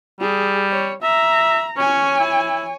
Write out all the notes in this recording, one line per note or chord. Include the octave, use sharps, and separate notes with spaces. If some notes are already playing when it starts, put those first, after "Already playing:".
G3 G#4
C#5
E5 A#5
C#4 C#5 G#5
E4